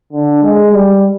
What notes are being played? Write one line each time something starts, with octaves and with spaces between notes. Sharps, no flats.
D3
G#3
G3